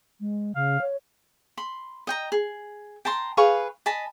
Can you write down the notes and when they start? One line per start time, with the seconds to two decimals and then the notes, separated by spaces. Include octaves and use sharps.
0.20 G#3
0.55 C#3 F5
0.81 C#5
1.57 B5 C6
2.07 D#5 G5 A#5
2.32 G#4
3.05 G5 A5 A#5 C6
3.37 G#4 B4 F5 C#6
3.86 D#5 G#5 A5 B5